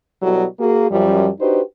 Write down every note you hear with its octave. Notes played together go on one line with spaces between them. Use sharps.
B2 F#3 G3 E4 F#4 A4
A#3 F#4 G#4
F#2 F3 G3
D4 D#4 F#4 G4 B4 C5